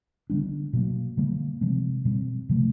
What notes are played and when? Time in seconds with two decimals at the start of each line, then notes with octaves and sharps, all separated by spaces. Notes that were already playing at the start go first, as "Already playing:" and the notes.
0.30 D3 G3 B3 D4
0.73 B2 F#3 A#3
1.17 D3 G3 A#3
1.61 C3 F3 G#3 C4
2.05 B2 G3 C4
2.49 C3 F3 A3